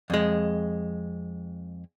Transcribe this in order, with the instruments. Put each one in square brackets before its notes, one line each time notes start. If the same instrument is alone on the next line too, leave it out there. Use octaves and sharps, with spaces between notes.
[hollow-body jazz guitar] F2 G#3